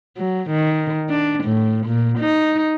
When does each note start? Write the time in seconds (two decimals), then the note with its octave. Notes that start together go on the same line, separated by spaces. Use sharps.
0.17 F#3
0.50 D#3
1.09 D4
1.44 A2
1.86 A#2
2.18 D#4